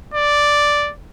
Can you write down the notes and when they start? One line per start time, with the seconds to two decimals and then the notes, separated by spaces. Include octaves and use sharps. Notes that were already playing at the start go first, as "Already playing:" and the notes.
0.14 D5